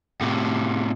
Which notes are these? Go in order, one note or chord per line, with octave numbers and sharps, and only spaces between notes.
A2 C3